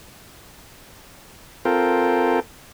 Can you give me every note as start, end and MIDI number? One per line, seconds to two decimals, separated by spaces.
1.65 2.40 60
1.65 2.40 65
1.65 2.40 69
1.65 2.40 70
1.65 2.40 79